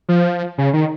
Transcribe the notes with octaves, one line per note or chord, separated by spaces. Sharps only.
F3
C#3
D#3